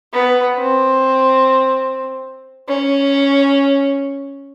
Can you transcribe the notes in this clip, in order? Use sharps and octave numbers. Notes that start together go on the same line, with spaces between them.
B3
C4
C#4